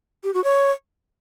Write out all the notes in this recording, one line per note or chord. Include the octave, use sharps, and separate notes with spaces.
G4
F#4
C#5